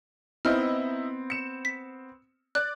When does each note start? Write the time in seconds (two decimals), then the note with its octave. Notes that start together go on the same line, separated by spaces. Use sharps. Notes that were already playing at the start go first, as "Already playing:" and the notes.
0.45 B3 C4 D#4 E4 D#5 F6
1.30 C#7 E7
1.65 B6
2.55 D5 F#6